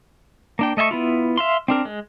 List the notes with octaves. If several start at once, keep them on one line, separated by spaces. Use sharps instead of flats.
A#3 D4 G5
A3 D#5 E5 G#5 C#6
B3 E4 F4
E5 F5 C6
C4 D4 A#4
G#3